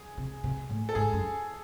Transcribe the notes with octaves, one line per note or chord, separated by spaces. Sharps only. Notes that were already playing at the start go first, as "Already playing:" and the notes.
Already playing: G#4
C3
C3
A2
A4
G#2 G#4
F#2